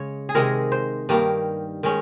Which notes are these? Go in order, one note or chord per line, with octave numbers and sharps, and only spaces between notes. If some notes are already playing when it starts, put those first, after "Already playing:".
Already playing: C#3 G#3 C#5
G#4
C3 D#3 G#3 A#4
C5
G2 D#3 G3 A#3
D#3 G#3 C#4